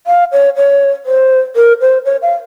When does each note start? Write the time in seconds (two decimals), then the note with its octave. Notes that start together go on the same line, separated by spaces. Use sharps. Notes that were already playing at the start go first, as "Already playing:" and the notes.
0.07 F5
0.32 C#5
0.56 C#5
1.05 C5
1.56 A#4
1.81 C5
2.05 C#5
2.22 F5